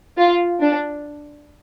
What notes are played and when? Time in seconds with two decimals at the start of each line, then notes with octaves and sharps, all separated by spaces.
0.18 F4
0.61 D4